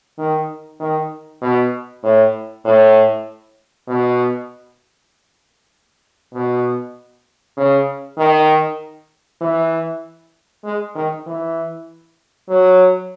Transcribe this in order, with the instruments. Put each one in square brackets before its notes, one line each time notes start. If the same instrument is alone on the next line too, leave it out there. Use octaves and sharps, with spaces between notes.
[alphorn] D#3
D#3
B2
A2
A2
B2
B2
C#3
D#3
E3
G#3
D#3
E3
F#3